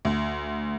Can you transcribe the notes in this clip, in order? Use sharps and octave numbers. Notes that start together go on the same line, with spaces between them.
D2